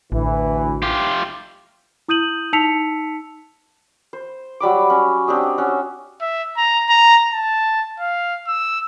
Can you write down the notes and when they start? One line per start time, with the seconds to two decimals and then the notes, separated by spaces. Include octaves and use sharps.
0.12 A1 D2 E3
0.82 F4 G4
2.09 E4 D#6 G6 D#7 F#7
2.53 D#4 A5 E6 B6 C#7 F7
4.13 C5
4.60 F#3 G3 B5 D6
4.90 C#4
5.28 C4 D4 G4 D#5
5.58 C#4 F#4
6.21 E5
6.57 A#5
6.89 A#5
7.33 A5
8.00 F5
8.47 E6